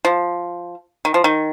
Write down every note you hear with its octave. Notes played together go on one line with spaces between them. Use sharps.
F3
D#3
F3
D#3